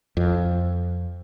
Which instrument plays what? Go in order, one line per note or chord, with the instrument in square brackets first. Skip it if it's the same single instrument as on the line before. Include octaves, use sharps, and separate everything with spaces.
[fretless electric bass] F2